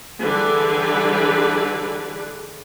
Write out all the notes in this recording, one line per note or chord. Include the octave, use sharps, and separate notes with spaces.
D3 E3 G3 G#4 B4 D5